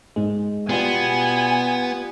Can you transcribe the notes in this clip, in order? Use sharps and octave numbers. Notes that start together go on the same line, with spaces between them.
G#2 G#3
B2 G3 B3 F4 G#5 C7